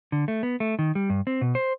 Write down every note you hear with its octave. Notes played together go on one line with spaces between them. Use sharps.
D3
A3
B3
A3
D#3
G3
G2
C4
B2
C5